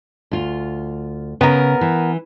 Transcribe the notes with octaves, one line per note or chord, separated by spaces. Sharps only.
D2 F4
C#3 B3 A#4
E3